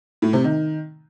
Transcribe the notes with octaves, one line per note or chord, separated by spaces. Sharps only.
A2
C3
D#3